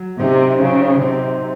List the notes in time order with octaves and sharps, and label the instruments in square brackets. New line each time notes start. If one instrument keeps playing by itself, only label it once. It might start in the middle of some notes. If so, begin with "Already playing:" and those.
Already playing: [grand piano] F#3
[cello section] C3 [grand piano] C4 D#4
[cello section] C#3 [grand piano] F#3
[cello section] C3 [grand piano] C4 D#4